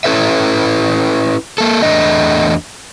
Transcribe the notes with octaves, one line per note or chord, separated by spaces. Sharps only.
C#4 E4 A4 B4 E5
A#3 A4
E2 A3 D4 D#5